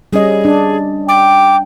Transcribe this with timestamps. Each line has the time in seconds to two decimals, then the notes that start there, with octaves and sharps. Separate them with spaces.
0.13 G3 C#4 G#4 D#5
0.45 D4
1.08 G5 D6